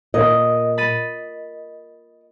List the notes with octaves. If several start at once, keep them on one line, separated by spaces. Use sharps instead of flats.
A#2 D#5
B5 A6 D#7